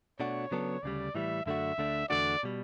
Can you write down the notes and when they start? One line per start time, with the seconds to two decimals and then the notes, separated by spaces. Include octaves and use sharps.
0.19 B2 A3 D4 F#4 C#5
0.51 C#3 F#3 B3 D4 A4
0.83 D2 C#3 G3 D5
1.15 A2 E3 G3 E5
1.46 F#2 D3 A3 D4 F#4 E5
1.78 D2 D3 A3 D4
2.09 E2 D3 A3 D4 F#4 D5
2.43 B2 G3